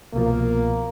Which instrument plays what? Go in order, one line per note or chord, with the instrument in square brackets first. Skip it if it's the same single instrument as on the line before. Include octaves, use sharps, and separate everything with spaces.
[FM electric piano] C2 B2 F3 [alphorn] A#3